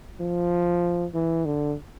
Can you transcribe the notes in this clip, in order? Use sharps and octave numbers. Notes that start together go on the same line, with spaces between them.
F3
E3
D3